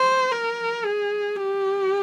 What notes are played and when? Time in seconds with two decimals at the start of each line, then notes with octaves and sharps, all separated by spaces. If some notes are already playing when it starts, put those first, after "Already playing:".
Already playing: C5
0.32 A#4
0.85 G#4
1.36 G4